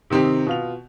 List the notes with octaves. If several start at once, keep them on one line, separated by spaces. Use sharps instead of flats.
C3 D#3 C4 D#4 G4
B2 F4 F7